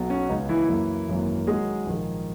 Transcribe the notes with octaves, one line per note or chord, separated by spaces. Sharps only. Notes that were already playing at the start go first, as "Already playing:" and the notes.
Already playing: B1 B2 F#3
C#4
C#2 C#3 G#3 B3 D#4
E3 E4
F#2 E3 A#3
G#1 F#2 E3 A#3
F#2 D#3 F#3 G#3 G#4
A#1 G#2 D#3 A#3